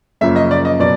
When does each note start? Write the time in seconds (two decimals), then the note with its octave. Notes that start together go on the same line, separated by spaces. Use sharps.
0.21 F#2 C#3 F3 A#3 E5
0.36 D#5
0.51 D5
0.65 D#5
0.80 B2 F#3 D5